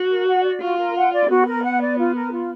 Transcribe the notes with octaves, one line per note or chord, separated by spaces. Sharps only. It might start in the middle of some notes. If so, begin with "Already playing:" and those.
Already playing: F#4
A#4
F#5
D5
F4 F#4
A#4
F#5
D5
B3 F#4
A#4
F#5
D5
F4
A#4
F4